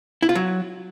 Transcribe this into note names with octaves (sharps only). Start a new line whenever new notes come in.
E4
F4
F#3